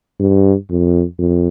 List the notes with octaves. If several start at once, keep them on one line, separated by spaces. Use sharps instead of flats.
G2
F2
F2